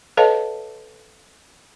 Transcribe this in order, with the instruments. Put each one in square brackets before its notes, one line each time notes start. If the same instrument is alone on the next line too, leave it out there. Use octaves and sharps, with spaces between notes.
[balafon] A4 B4 C#5 D#5 F5 A5